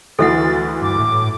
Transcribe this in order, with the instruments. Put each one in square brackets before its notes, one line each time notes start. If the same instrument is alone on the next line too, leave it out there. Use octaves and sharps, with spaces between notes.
[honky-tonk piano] D2 E3 [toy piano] A4 E5 F#5 [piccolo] A6
[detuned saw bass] G2 [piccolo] D6
[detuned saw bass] A2